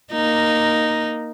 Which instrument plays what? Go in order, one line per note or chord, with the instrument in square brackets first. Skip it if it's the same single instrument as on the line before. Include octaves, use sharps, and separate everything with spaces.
[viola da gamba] A#3 D#4